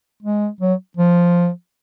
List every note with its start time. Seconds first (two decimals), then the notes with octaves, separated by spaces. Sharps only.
0.23 G#3
0.61 F#3
0.97 F3